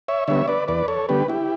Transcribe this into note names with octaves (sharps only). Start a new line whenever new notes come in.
C#5 E5
D3 G3 B3 C#5 E5
B4 D5
E2 B4 D5
A4 C#5
D3 G3 B3 G4 B4
E4 G4